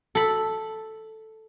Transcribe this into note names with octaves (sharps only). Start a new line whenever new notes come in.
A4 B5